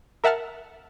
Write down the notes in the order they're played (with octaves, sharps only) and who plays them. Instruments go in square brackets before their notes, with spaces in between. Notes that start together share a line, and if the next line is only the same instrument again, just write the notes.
[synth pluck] A#4 E5 F#5 A5 F6